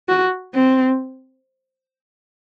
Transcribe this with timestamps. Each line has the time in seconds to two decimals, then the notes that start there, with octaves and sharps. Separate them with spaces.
0.08 F#4
0.54 C4